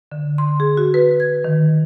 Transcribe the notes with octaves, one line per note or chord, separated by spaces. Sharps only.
D3
C6
G#4
F#4
B4
G#6
D#3